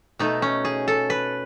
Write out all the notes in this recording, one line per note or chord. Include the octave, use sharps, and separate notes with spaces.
B2 A3 D#4
C#4
G#4
A4
B4